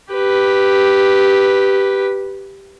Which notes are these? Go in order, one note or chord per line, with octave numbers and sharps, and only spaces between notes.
G4 B4